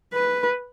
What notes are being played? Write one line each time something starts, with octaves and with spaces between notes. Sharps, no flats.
B4